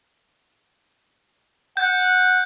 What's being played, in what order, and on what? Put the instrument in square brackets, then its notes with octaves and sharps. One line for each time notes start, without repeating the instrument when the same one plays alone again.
[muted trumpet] F#5 [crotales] G6